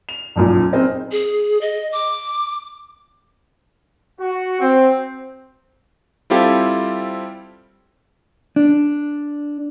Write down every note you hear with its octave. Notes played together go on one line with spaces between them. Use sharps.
F7
B1 F#2 A#2
C4 D#4 G#4 A#4 D#5
G#4
D#5
D6
F#4
C4
G3 C4 E4 F4 G4 A4
D4